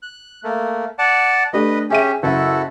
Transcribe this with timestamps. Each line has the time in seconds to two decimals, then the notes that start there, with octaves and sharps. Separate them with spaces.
0.02 F#6
0.44 A3 A#3
0.99 D5 F#5 A5
1.53 A3 D4 G4 B4 D#5
1.90 C#4 G4 G#4 E5 D#7
2.23 F#1 E4 F#4 A4